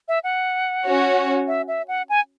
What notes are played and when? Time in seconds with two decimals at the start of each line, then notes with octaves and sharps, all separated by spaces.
0.08 E5
0.24 F#5
0.85 C#4 F#4 C#5
1.48 E5
1.68 E5
1.88 F#5
2.09 G#5